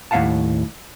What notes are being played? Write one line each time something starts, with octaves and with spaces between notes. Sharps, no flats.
D#2 A2 F4 F5 F#5 A5